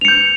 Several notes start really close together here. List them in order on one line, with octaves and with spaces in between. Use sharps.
F7 C#7 G6